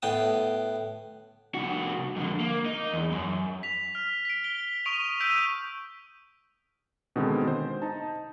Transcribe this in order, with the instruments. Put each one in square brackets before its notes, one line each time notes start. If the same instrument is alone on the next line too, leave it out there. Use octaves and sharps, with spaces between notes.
[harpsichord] A2 B3 G5 D#6
[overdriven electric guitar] C2 F#4
F2 D3
A#3
D#4
E2
F#2
[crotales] B6 F7
F6
B6 D7
G7
C#6 D#6 D7 D#7 F7
E6 G6 B6 D7 D#7
[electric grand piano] B2 D3 D#3 G#3 B3 C4
C5
D#4 A5